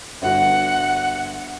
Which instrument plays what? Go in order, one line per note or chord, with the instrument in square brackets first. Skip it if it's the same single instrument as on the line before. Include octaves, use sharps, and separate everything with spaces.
[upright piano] G1 F#4 [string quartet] F#5